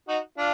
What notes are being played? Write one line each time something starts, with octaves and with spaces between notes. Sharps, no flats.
D#4 F#4
D4 F4